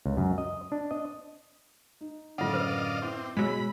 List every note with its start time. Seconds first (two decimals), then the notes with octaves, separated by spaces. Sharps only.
0.06 C#2
0.17 F#2
0.38 D#5
0.72 D4
0.91 D#5
2.01 D#4
2.38 F#2 A2 D3 F4 D5 D#5 F5 F#5
2.54 B4 C5
3.02 C4 E4 E5 D6
3.37 B2 F#3 G#3 G#5 B5 E6